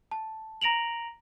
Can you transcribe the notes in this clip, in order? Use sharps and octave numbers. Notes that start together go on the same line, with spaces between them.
A5
A#5 A#6 D7 F7 F#7